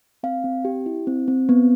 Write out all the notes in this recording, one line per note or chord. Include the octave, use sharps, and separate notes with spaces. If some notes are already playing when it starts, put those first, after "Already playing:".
C4 F5
C4
G4
E4
C4
C4
B3